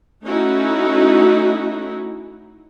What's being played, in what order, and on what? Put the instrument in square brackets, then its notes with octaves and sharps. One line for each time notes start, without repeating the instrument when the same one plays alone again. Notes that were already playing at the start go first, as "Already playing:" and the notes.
[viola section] A3 C#4 D#4 E4 F#4